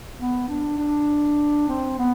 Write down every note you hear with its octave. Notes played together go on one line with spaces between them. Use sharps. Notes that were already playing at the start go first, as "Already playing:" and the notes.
B3
D4
D4
C4
B3